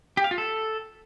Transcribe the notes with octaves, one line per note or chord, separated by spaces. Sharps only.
G4
F5
F4
A4